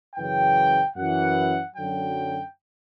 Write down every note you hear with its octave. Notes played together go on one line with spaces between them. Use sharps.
F#2 C#3 E3 G5
F#2 E3 F#5
F#2 D3 F#3 G5